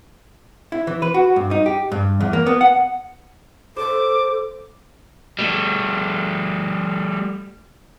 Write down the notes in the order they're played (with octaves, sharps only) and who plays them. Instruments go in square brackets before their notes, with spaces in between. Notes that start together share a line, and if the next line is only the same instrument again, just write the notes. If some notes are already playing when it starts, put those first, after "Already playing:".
[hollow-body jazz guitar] E4
E3
B4
F#4
G2
D#4
G4
G2
E2
A#3
B3
F#5
[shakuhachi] A4 [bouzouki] C5 [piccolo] D6
[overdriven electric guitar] G3 A3